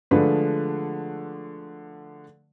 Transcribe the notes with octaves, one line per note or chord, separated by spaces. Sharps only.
D3 F3 G#3 A3 D4 B4